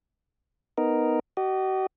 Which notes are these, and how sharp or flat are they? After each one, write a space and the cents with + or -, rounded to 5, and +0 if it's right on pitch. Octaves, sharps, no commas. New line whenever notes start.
B3 +5 D#4 +0 A#4 +0
F#4 +45 D#5 -25